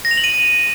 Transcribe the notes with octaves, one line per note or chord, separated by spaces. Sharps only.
A#6
F7
F#7
D#7